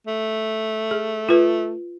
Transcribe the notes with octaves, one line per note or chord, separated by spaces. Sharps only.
A3
G#4
F4 B4